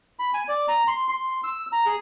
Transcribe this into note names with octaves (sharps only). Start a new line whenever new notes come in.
B5
G#5
D5
A#5
C6
C6
E6
A#5
G#4